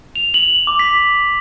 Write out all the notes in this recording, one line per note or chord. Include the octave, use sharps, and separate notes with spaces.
F7
F#7
D6
B6